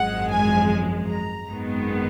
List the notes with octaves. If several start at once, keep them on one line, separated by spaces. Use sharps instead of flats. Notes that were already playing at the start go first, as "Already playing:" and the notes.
Already playing: G#1 F#2 F3 G#3 F#5
G#5
A#5
G#1 F#2 D#3 G#3 B3